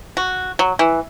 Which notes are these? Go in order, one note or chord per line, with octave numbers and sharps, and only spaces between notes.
F#4
F#3
E3